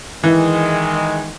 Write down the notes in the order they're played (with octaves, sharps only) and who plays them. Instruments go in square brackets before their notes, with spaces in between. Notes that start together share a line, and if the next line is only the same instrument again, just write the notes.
[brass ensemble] D#3 G#3 [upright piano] E3